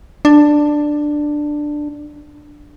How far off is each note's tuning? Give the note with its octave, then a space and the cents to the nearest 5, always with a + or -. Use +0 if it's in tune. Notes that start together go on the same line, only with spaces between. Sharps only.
D4 +10